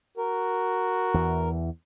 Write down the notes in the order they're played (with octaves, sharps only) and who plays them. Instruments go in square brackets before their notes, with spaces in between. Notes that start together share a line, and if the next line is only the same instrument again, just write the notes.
[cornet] F#4 [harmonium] A#4
[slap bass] E2 E3